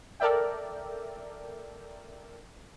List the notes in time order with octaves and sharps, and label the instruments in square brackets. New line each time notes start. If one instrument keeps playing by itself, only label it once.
[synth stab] A4 A#4 D5 E5 G5